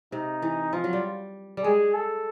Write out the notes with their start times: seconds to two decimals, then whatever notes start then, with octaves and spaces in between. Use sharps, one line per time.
0.12 C3 D#4
0.42 E3
0.73 F3 F4
0.84 F#3
0.93 G3
1.57 G3
1.64 G#3 G#4
1.94 A4